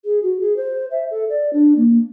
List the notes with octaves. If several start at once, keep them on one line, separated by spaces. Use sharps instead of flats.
G#4
F#4
G#4
C5
E5
A4
D5
D4
A#3